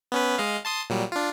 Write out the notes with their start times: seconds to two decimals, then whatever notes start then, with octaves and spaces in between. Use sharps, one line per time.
0.12 B3 C#4 B4
0.38 G#3 D#5 F5
0.65 A5 C6 D#6
0.90 A#2 F#3 G3
1.12 D4 F4